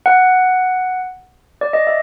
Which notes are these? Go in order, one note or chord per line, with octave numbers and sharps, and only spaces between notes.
F#5
D5
D#5
E5